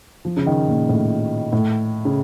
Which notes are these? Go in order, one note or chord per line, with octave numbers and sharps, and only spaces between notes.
F3
C#3
D#3
A#2
A2
A2
C#3